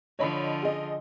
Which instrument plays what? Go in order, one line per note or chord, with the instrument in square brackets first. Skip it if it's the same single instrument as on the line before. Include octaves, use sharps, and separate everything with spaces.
[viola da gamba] D3 F3 [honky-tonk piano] C#5 D#5 B5
[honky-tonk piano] G#4 D#5